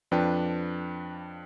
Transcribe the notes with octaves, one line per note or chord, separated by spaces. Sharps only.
F2 F3 D4 B4 G5